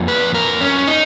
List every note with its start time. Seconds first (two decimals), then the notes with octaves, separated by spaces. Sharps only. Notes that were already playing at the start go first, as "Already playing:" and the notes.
Already playing: F2 F3 A#3
0.08 B4
0.34 A#4
0.61 C#4
0.87 D#4